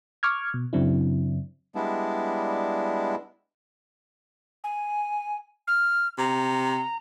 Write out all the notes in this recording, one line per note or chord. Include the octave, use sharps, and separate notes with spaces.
C#6 D6 F6 G#6
B2
F#2 C#3 F#3 C4 D4 E4
G3 G#3 B3 D4 E4
G#5
F6
C3 A#5